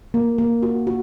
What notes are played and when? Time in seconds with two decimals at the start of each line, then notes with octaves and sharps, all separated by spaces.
0.14 A#3
0.38 A#3
0.63 F#4
0.87 F#4